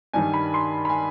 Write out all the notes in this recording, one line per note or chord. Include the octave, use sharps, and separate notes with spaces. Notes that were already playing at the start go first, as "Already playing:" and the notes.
G2 D#3 G3 G#5
B5
C6
B5
G#5